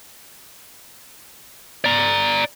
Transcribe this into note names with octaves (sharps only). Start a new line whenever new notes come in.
D5 A#5